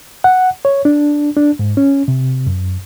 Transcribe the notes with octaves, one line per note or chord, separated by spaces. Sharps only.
F#5
C#5
D4
D4
G#2
C#4
C3
F#2